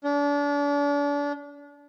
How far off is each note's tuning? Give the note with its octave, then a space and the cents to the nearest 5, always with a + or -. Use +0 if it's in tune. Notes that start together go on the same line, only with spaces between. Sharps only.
D4 -35